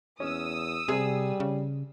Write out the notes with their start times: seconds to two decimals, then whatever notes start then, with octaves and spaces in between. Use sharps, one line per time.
0.20 E2 C#4 D#6 E6
0.88 C3 G3 G#4
1.40 C#3